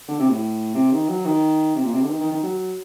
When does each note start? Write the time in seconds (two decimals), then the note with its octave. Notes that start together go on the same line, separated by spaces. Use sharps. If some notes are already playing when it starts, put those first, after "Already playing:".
0.08 D3
0.19 C3
0.30 A2
0.75 C3
0.92 D#3
1.09 F#3
1.25 D#3
1.76 C3
1.84 A#2
1.93 C3
2.02 D3
2.10 D#3
2.21 D#3
2.32 D#3
2.43 F#3